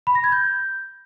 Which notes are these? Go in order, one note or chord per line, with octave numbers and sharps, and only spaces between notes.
B5
A#6
G#6
G6